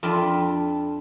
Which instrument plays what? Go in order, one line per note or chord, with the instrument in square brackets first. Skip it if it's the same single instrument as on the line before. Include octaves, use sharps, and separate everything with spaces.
[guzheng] F2 D4 F4 B5